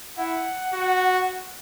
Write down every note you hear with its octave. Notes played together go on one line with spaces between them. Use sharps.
E4 F#5
F#4